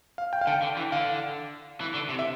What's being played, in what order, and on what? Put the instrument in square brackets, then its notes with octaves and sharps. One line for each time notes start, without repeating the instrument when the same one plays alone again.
[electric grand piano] F5
G5
F5
[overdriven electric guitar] D3 [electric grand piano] G5
[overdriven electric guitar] D3
E3
[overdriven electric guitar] D3 [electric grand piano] F5
[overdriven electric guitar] E3
D3
C3
[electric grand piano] E5